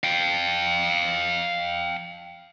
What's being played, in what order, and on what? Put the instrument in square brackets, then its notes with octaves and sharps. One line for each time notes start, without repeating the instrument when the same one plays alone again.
[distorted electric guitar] F5 G5